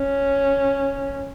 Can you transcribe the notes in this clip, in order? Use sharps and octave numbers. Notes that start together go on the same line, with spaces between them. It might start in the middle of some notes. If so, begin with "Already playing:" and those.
Already playing: C#4